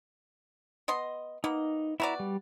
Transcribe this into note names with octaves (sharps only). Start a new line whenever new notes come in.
B3 D#5 C6
A#3 B3 D#4
B3 E4 F#4 D5 A#5
G3